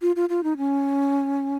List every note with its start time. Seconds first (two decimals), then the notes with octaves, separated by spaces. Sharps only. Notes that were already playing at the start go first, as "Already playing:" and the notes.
0.02 F4
0.16 F4
0.29 F4
0.44 D#4
0.57 C#4